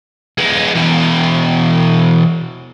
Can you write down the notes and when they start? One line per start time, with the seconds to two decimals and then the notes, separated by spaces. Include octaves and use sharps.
0.38 G#3 B3
0.75 E2 B2